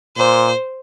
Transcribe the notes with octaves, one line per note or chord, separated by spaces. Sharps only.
A#2 C5